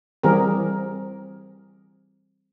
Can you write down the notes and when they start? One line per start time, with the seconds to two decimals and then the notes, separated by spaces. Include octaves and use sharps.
0.23 E3 G3 C4 G4 G#4 A#4